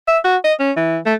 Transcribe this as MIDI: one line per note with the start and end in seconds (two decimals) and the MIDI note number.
0.08 0.19 76
0.25 0.37 66
0.44 0.54 75
0.60 0.72 61
0.77 0.99 52
1.06 1.14 57